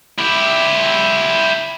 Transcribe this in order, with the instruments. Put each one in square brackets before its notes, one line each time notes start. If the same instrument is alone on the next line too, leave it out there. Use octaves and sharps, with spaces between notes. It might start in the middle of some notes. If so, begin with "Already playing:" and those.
[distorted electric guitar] E4 G4